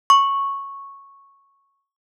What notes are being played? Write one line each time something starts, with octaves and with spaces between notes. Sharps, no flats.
C#6